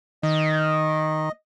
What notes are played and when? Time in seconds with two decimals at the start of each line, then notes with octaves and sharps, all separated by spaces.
0.23 D#3 D#5